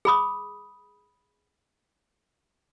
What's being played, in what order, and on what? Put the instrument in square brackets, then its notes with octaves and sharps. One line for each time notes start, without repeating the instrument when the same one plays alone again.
[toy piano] G#4 B5 D#6